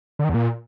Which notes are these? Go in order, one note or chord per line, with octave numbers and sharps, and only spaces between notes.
D3
D#3
E2
A#2